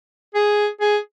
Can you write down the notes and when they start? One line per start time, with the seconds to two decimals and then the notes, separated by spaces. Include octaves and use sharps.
0.35 G#4
0.81 G#4